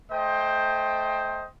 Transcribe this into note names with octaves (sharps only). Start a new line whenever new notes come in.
A3 C5 D#5 G5